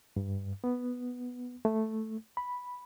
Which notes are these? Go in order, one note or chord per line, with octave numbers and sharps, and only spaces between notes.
G2
B3
A3
B5